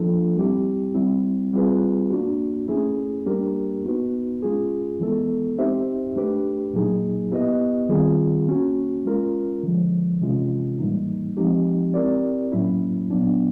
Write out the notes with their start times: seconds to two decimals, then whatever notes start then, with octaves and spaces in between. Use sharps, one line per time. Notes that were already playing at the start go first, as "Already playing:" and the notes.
Already playing: F3 A#3 D4 F4 A4
0.36 G3 C4 E4 G4
0.95 G3 C4 E4
1.53 G3 C4 F4 G#4 B4
2.10 A#3 D4 F#4
2.68 A3 C#4 E4 G#4
3.26 G3 A#3 D4 G4 A#4
3.84 B3 D#4 F#4 B4
4.42 G#3 C#4 F4 G#4
5.00 E3 G#3 B3 E4 A4
5.57 C4 D#4 G4 C5 E5
6.16 A3 D4 G4 B4
6.73 A#2 F#3 A#3 D#4 G#4
7.31 B3 E4 G4 B4 D#5
7.89 D#3 G3 C4 F4 G#4
8.48 A#3 C#4 F#4
9.05 G#3 C#4 F4 A#4
9.63 D3 F3 G#3
10.21 C3 E3 G#3 C#4 F4
10.79 A2 E3 G3 A#3 D#4
11.37 F3 G#3 C4 D#4 G4
11.94 C4 E4 G4 A#4 D5
12.52 A2 F#3 A#3 C#4 E4
13.10 A#2 F#3 B3 D4